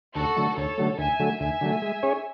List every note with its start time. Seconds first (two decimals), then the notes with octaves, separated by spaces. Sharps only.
0.16 D2 F#4 A4
0.37 D3 F#3 A3
0.57 D2 A4 C#5
0.78 D3 F#3 A3
0.98 D2 E5 G#5
1.19 D3 F#3 A3
1.40 D2 E5 G#5
1.61 D3 F#3 A3
1.82 G#3
2.03 C#4 G#4 C#5